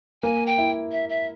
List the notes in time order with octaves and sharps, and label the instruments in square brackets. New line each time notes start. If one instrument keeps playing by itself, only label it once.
[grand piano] A#3 [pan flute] G#5
[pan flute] G5
[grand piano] E4
[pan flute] E5
E5